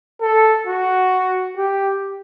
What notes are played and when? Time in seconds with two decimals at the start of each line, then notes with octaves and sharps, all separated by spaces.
0.21 A4
0.67 F#4
1.57 G4